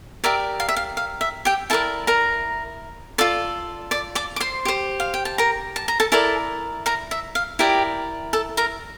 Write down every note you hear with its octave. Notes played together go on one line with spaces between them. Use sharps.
G4 A#4 D5 E5
F5
E5
F5
F5
E5
G4 G5
E4 A4 A#4 D5 A5
A#4 A#5
F4 A4 D5
D5 D6
D5 D6
D6
C5 C6
G4 C5
F5
G5
A5
A#4 A#5
A5
A#5
A4 A5
E4 A4 A#4 D5 A5
A#4 A#5
E5
F5
E4 G4 A#4 D5 G5
A4 A5
A#4 A#5